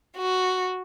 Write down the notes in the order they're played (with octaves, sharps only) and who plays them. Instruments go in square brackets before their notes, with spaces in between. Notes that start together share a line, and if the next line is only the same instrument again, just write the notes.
[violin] F#4